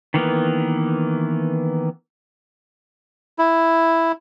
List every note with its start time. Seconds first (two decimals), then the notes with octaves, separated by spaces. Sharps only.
0.14 D#3 E3 A#3 B3
3.39 E4